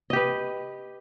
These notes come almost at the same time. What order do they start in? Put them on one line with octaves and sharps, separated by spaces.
D#5 G4 B4